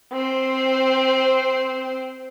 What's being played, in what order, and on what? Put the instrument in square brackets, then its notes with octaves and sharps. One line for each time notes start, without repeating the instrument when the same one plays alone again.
[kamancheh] C4 C5